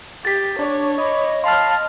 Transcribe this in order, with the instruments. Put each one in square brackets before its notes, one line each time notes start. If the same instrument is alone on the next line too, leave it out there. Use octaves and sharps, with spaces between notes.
[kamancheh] G4 [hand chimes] A6 B6
[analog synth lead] D4 [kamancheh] C#5 [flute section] D6
[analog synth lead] D#5 [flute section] B5 D6
[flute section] F5 A5 B5 [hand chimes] C6 F6